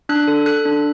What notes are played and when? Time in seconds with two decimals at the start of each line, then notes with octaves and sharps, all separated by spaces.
0.09 D4 F#6
0.28 A4
0.46 A4 F#6
0.65 D4